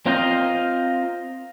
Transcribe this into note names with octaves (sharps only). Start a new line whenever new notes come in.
C4 F4 A#4 C5 D#5